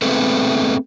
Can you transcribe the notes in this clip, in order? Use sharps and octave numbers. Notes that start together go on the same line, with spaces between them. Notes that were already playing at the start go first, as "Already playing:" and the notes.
A3 B3 C4 G#4 A4 B4